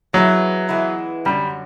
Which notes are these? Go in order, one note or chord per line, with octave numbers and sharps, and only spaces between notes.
E3 F#3 G#3 B3 E4
E3 G#3 B3 E4
F#2 D3 F#3 G3